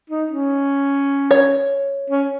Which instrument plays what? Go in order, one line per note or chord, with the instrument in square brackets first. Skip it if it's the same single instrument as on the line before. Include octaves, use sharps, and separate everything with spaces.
[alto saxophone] D#4
C#4
[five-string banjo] C#5
[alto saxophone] C#4